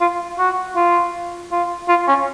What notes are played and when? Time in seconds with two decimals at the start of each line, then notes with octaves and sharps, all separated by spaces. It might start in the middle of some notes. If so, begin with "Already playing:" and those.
0.01 F4
0.39 F#4
0.76 F4
1.51 F4
1.88 F4
2.08 C#4